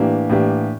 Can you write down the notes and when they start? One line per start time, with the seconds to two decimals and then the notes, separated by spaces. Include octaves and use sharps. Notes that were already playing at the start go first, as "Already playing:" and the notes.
Already playing: A2 E3 A#3 D4 G4
0.29 A2 E3 A#3 D4 G4